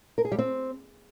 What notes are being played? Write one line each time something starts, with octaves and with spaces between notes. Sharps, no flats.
A#4
G#4
G3
C4